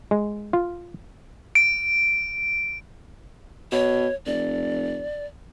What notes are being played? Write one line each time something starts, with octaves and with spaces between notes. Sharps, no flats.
G#3
F4
D7
B2 C#5
F1 D5